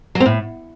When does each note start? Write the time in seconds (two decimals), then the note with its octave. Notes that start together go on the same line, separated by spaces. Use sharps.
0.15 F#3
0.20 C4
0.26 A2